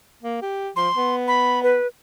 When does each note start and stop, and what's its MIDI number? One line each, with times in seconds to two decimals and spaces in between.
0.22 0.37 58
0.42 0.69 67
0.76 0.89 53
0.76 1.15 84
0.96 1.76 59
1.28 1.62 83
1.63 1.87 71